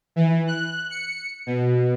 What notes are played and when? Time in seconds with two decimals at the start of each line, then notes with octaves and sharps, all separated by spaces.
0.16 E3
0.47 F#6
0.91 C#7
1.46 B2